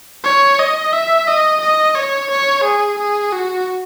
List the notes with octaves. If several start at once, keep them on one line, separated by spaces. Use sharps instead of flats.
C#5
D#5
E5
D#5
D#5
C#5
C#5
G#4
G#4
F#4